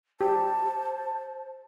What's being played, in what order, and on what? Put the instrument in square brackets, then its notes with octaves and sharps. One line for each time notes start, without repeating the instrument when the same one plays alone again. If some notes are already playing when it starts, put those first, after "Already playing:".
[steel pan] G4 [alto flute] C5 [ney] A5